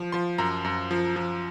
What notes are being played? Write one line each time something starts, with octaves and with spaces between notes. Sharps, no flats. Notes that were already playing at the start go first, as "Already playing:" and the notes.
Already playing: F3
F3 C6
F#2 A#5
F#2
F3
F3